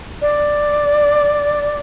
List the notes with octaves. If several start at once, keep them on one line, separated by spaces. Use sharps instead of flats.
D5